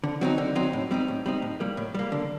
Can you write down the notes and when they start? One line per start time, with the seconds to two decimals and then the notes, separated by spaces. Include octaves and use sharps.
0.04 D3
0.21 F#3 C4 D#4
0.38 D3
0.55 F#3 C4 D#4
0.73 A2
0.91 G3 C4 D#4
1.08 A2
1.26 G3 C4 D#4
1.42 A2
1.60 G3 A#3
1.77 A2
1.94 G3 A#3
2.12 D3